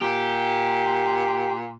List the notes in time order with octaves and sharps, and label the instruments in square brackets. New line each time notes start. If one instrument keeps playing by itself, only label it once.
[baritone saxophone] A#2 [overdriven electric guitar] G4